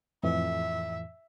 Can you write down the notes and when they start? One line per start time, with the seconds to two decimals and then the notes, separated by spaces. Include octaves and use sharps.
0.23 F2 A2 E3 E5